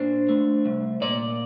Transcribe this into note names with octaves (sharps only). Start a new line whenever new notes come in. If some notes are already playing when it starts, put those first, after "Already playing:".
Already playing: A#2 D4 C5
A3
C2
A#2 D5